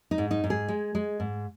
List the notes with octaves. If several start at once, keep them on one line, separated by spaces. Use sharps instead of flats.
D#4
G#2
D#4
G#2
G#4
G#3
G#3
G#2